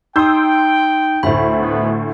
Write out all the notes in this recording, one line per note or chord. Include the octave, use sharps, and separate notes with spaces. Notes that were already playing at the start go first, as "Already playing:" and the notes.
D#4 G5 C6 D#6 E6 G6
D2 A2 C5 E5 B5
D#3 E3 B3